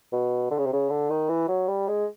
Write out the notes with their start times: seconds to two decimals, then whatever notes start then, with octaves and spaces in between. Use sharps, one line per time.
0.13 B2
0.51 D3
0.58 C#3
0.66 C3
0.73 C#3
0.89 D3
1.10 D#3
1.29 E3
1.48 F#3
1.68 G3
1.88 G#3